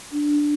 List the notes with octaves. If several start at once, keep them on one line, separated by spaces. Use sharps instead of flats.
D4